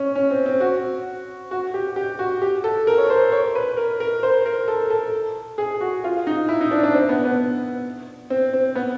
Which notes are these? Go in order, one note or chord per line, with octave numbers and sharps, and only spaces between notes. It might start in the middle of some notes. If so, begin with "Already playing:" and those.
Already playing: C#4
C#4
C4
C4
F#4
F#4
G4
G4
F#4
G4
A4
A#4
C#5
C5
C#5
B4
A#4
A#4
C5
A#4
A4
A4
G#4
F#4
F4
D#4
E4
D#4
D4
D4
C4
B3
B3
C4
C4
B3